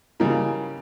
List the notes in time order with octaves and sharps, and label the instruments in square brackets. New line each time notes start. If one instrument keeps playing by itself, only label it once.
[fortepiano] C#3 E3 F#3 G3 A#3 D#4